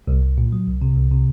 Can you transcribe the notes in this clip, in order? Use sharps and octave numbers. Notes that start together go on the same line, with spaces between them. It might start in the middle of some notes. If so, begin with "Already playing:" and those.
C2
C2
A#2
F#3
C2
C3
C2
C3